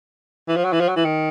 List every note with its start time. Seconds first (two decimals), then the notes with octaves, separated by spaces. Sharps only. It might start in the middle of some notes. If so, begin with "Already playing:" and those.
0.48 E3
0.56 F3
0.64 F#3
0.72 E3
0.80 F3
0.88 F#3
0.96 E3
1.05 D#3